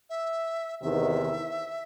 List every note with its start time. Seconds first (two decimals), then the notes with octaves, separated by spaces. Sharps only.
0.10 E5
0.82 E2 C3 D#3 E5